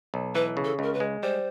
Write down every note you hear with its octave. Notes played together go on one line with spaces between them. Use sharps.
B1
E3 B4
C#3
A4
C#2 A#4
B4
G#3
G3 C5